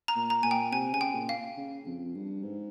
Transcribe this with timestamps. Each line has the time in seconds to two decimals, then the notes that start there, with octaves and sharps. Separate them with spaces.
0.08 A#5
0.16 A#2
0.30 A#5
0.43 A#2 G#5
0.51 G5
0.73 C3 G#5
0.93 C#3 G#5
1.01 G5
1.15 A#2
1.29 F5
1.57 C#3
1.86 F2
2.15 G2
2.43 G#2